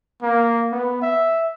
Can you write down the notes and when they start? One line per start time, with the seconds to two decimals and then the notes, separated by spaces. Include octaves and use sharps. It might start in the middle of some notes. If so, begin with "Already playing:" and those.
0.22 A#3
0.72 B3
1.02 E5